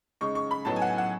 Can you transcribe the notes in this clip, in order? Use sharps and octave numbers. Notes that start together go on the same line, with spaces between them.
C#3 G#3 D#4 C#6
C#6
B5
A2 F#3 B3 D#4 A5
G#5
F#5
G#5
F#5